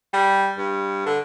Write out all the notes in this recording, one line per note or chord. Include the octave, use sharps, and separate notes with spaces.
G3
G2
D3